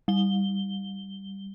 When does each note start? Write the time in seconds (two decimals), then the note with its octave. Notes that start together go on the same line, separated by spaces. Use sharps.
0.08 G3 G7